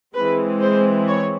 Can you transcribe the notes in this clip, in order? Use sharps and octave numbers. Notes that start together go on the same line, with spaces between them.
E3 G#3 C4 B4
C5
C#5